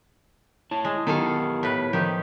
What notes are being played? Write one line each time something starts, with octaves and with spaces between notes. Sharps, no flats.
E4 C#5 A5
G#3
D#3 B3 E4 G4 A4 F5
A2 B4
D#3 F3 G4